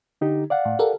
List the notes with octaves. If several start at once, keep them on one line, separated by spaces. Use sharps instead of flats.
D3 D#4 G4
D5 F5 F#5
A2
G4 A4 A#4